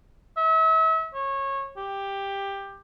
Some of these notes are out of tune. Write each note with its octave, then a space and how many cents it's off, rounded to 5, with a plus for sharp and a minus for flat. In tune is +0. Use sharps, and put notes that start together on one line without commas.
E5 -35
C#5 -20
G4 +10